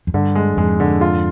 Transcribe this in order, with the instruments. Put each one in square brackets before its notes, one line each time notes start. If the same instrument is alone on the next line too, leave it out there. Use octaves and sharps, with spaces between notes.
[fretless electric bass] F2
[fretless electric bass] G2 [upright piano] D3
[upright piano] G#3
[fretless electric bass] F2 G#2 [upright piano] G#3
[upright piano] D3
F4